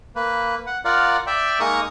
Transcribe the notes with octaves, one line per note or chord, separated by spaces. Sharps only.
A#3 B4
F#5
F4 A#4 D5 F5 F#5
D5 E5 G5
G#3 A#3 D#4 A#4 C#6 D#6